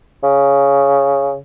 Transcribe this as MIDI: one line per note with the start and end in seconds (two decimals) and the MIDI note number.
0.23 1.37 49